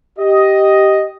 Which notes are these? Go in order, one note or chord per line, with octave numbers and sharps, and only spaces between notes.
G4 D#5